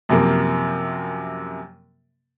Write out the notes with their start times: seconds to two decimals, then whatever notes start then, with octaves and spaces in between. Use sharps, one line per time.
0.09 F#2 C3 F3 A#3